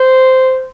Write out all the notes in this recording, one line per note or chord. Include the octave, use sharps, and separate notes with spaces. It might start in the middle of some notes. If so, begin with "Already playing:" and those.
Already playing: C5